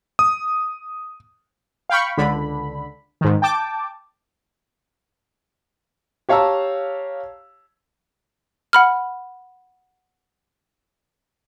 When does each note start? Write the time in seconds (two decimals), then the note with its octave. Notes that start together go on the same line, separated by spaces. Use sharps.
0.19 D#6
1.90 F5 G5 B5 C#6
2.17 C#2 D3 B5
3.21 G#2 D#3
3.42 G5 A5 D6
6.29 G4 C#5 F5 A5 A#5 E6
8.73 F#5 B5 F6